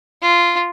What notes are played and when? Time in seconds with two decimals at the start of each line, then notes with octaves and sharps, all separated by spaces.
0.22 F4